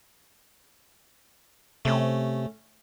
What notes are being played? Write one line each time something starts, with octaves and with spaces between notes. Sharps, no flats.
C3 A3 C#4